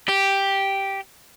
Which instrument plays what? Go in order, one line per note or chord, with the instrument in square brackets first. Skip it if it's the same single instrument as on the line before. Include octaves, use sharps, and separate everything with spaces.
[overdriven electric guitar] G4